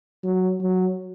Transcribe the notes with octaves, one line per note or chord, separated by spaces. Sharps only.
F#3
F#3